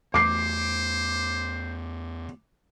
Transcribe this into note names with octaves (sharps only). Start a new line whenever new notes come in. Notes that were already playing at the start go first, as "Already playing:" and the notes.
E2 A3 C5 D6 C7